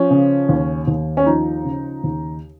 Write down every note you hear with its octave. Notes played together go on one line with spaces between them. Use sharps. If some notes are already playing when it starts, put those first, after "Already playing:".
Already playing: F3 C#4
C#3
D#2
D#2
C#4
F3 D#4
C#3
D#2